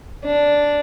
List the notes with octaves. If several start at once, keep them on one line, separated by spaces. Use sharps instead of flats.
D4